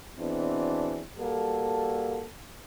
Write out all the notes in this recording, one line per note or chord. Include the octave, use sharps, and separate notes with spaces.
E2 B2 E3 C4 D4
G3 A#3 F#4 A4